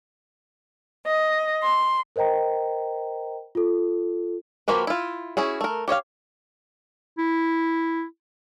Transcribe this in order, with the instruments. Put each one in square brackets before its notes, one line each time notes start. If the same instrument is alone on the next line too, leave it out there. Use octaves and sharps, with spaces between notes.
[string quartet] D#5
C6
[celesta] A#4 C5 D#5 G5 A#5
F4 A4
[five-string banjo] F3 A#3 F#4 G4 B4
E4 F4
C#4 E4 F#4 G#4
A3 A#4
G4 C#5 D#5 F5
[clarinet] E4